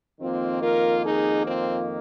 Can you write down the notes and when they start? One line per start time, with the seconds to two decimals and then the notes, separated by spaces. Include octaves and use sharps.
0.21 F2 D#3 A#3 C4 F4
0.62 F4 A#4
1.04 D#4 G#4
1.46 C4 F4